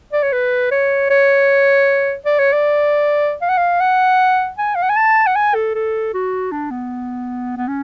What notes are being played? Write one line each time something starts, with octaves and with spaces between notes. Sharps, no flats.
D5
C#5
B4
C#5
C#5
D5
C#5
D5
F5
F#5
F5
F#5
G#5
F5
F#5
G#5
A5
F#5
G#5
A4
A4
F#4
D4
B3
B3
C#4